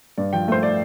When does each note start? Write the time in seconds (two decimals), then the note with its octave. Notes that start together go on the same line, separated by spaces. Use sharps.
0.18 G2 D5
0.33 F3 G5
0.48 A3 C5
0.63 D5